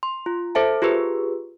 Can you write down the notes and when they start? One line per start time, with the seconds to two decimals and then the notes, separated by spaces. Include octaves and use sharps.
0.03 C6
0.26 F4
0.55 A4 C5 E5 A5
0.82 F4 G4 G#4 B4